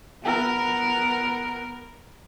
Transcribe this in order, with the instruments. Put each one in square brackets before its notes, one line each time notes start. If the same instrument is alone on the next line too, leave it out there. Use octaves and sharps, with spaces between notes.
[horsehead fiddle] B3 A#4